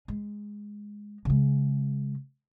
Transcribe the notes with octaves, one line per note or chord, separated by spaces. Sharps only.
G#3
C#3 G#3